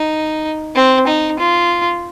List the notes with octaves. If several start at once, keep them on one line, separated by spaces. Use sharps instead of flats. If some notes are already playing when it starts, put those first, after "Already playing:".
Already playing: D#4
C4
D#4
F4